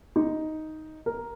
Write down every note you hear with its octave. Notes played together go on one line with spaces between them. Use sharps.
D#4
A#4